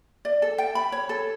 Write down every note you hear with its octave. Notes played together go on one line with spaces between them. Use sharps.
D5
A4
G5
B5
C#5
A4